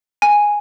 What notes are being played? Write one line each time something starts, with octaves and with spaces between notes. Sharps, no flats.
G#5